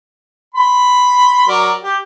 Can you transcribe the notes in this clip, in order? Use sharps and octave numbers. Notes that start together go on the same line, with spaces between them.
B5 C6
F#3 A#4 D5
G4